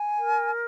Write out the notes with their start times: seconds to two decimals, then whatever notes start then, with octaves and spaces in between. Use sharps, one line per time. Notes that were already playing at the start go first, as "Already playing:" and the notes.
Already playing: G#5
0.18 A#4